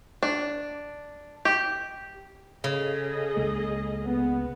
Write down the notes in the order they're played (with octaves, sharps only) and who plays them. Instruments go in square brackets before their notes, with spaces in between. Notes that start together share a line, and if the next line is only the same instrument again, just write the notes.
[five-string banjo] D4
G4
[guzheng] C#3 [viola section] G#4 A4 D#5
[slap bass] C#2 G#3 A#3
[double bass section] B3